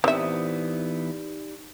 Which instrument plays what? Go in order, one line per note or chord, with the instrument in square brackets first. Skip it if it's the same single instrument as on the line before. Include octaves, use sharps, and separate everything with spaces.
[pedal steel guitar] E3 B3 D#6 [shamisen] C4 E5 [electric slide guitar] D#4 G4 D5